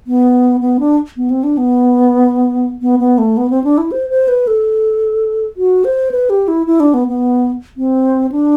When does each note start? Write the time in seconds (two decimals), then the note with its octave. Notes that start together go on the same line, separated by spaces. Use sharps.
0.07 B3
0.61 B3
0.80 D4
1.17 B3
1.30 C4
1.44 D4
1.57 B3
2.82 B3
2.99 B3
3.18 A3
3.37 B3
3.50 C4
3.64 D4
3.78 E4
3.92 C5
4.10 C5
4.28 B4
4.47 A4
5.57 F#4
5.85 C5
6.11 B4
6.30 G4
6.48 E4
6.67 E4
6.80 D4
6.94 B3
7.08 B3
7.77 C4
8.32 D4